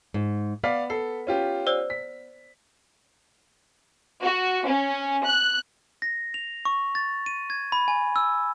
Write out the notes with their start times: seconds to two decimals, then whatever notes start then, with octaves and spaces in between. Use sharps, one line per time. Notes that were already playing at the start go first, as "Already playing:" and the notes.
0.14 G#2
0.64 B3 D5 F5 B6
0.90 A4 C7
1.27 C#4 F4 G4
1.67 C5 D5 E6
1.90 B6
4.23 F#4
4.67 C#4
5.26 F#6
6.02 A#6
6.34 F7
6.65 C#6
6.95 A6
7.26 D#7
7.50 G#6
7.72 B5
7.88 G#5
8.16 E6